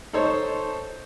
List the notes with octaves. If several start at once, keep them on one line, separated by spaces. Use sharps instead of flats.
D#4 A4 C5 C#5